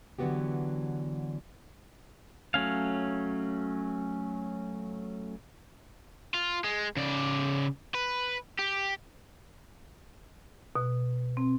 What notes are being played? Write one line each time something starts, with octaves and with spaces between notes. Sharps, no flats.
D3 E3 F#3 B3 F#4 G4
F#3 A3 C#4 F5
F4
G#3
C#3 D5
B4
G4
B2
C4